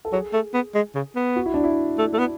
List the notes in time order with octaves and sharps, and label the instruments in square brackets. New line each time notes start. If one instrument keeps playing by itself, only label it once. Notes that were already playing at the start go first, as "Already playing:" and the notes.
[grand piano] A4
[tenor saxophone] F#3 [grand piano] G#4
[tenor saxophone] A3
B3
G#3
C#3
B3
[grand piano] F#4
E4
D4
E4
[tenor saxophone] A3
A3
B3